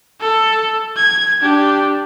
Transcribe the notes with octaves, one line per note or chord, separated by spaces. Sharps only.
A4
G#6
D4 G4